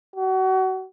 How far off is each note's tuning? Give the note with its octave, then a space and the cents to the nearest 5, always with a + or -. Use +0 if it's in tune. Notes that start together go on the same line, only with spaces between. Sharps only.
F#4 +30